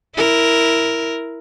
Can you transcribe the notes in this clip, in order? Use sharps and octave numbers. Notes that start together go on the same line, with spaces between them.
E4 A#4